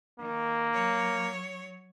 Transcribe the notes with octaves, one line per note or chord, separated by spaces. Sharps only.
D#3 A#3
F#3 C#5